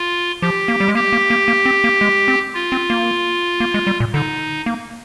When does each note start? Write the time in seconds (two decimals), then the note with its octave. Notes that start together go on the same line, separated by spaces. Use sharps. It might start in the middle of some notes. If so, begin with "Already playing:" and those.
Already playing: F4
0.42 F3 G4
0.68 A#3
0.80 G3
0.88 G#3
0.95 A#3 G4
1.13 A#3
1.30 A#3
1.48 A#3
1.66 C4
1.84 A#3
2.01 G#3
2.28 C4
2.54 F4
2.72 C4
2.90 A#3
3.60 A#3
3.74 G#3
3.87 G3
4.00 A#2
4.14 D3 D#4
4.66 A#3